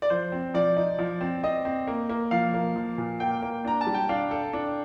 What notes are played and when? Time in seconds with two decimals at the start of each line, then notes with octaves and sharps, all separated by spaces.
0.02 D5
0.10 F3 C5
0.32 C4
0.54 F3 D5
0.77 D#4
0.99 F3
1.21 C4
1.43 C4 D#5
1.65 C4
1.87 A#3
2.09 A#3
2.31 F3 F5
2.54 A#3
2.76 F3
2.98 A#2
3.20 A#3 G5
3.42 A#3
3.65 D4 A#5
3.81 A5
3.87 G3
3.94 G5
4.09 D4 F5
4.31 A4
4.53 D4